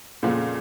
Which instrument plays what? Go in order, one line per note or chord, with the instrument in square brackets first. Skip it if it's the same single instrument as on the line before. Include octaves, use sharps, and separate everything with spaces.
[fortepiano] F2 C#3 F3 G#3 B3 [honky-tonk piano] A#2